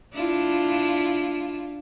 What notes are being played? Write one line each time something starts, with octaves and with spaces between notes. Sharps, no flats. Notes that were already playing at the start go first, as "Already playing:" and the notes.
D4 E4 F4